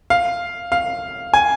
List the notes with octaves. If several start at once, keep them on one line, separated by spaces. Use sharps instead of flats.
F5
F5
G#5